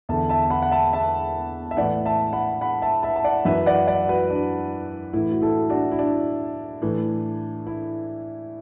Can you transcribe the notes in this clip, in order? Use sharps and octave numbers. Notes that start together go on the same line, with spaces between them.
E2 D3 E5 A5
E5 A5
F#5 B5
F#5
E5 A5
E5 A5
E5
A2 E3 D5 F#5
E5 A5
F#5 B5
F#5 B5
E5 A5
E5 A5
A5
D5 F#5
F#2 E3 B4 E5
D5 F#5
D5 F#5
F#4 B4
D4
A2 E3 E4
F#4
E4 A4
D4 F#4
E4
D4
A2 E3
E4